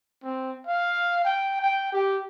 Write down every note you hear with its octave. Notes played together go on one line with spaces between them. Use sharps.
C4
F5
G5
G5
G4